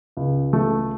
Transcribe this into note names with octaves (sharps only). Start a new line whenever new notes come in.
C#2
A3